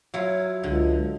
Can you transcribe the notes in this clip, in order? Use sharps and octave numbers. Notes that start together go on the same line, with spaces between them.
F#3 E4 F4
C#2 D3